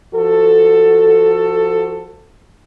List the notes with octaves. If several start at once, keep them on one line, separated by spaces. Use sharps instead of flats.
F3 F#4 A4